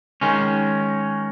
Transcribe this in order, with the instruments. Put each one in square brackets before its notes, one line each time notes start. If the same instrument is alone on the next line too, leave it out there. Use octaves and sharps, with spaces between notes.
[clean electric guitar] D#3 G#3 C#4